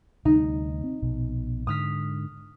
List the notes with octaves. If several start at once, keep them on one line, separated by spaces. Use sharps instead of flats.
D2 C3 G3 D#4
C4
A#1 B2
G#2 D3 D#6 F6 B6